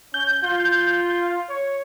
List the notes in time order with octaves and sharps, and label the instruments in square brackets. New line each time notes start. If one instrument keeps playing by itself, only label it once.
[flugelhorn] C#4 [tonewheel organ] G6
[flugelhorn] F4
C#5